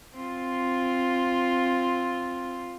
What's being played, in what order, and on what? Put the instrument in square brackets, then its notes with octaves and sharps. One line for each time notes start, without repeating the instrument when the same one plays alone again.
[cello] C4 F4